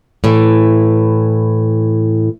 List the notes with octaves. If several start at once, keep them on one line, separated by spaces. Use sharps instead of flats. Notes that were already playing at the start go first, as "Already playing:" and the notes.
A2 E3